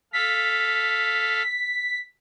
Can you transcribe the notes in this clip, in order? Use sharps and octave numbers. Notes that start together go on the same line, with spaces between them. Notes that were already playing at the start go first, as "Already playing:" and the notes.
A4 F5 B6